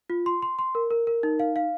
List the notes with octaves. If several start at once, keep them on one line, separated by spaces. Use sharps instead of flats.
F4
C6
C6
C6
A#4
A#4
A#4
D#4
F5
F5